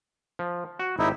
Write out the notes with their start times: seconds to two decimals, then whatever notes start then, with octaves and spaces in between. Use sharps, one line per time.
0.39 F3
0.79 F#4
0.99 G#1 D#4 E4 G4